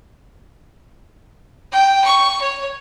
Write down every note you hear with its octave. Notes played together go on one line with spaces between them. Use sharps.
G5
C#6
C#5